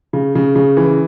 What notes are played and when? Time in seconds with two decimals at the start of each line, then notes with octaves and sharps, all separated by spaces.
0.13 C#3
0.35 C#3
0.56 C#3
0.77 E3